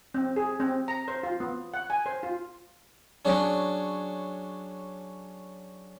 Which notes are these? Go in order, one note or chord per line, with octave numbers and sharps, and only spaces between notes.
C4
G#4
C4
A#5
C5
F4
B3
F#5
G#5
C5
F4
F#3 C#4 D4 G#4